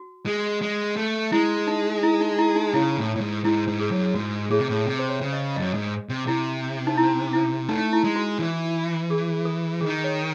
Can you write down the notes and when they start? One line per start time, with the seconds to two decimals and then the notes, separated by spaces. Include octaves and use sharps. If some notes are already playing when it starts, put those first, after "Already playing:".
Already playing: F#4
0.26 G#3
0.62 G#3
0.96 A3
1.32 G#3 E4
1.67 D#4
2.03 E4
2.21 D#4
2.38 E4
2.56 D#4
2.74 C#3 E4
2.97 A2
3.16 A2
3.21 G#2
3.44 G#2 E4
3.68 G#2
3.80 G#4
3.91 F#2
4.14 G#2 F#4
4.51 A2 G#4
4.59 C3
4.68 A2
4.86 C3
4.99 C5
5.09 C#5
5.21 C#3
5.33 D#5
5.56 F#2 D#5
5.74 G#2
6.09 C3
6.27 C3 E4
6.87 D#4
6.97 E4
7.33 E4
7.69 A3 D#4
7.93 E4
8.04 G#3
8.16 F#4
8.39 E3
9.10 G#4
9.45 A4
9.81 D#3 G#4
10.04 C#5